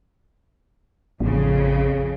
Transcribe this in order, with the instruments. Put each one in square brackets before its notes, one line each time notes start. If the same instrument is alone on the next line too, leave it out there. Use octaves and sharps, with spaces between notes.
[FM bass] A1 [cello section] F2 C#3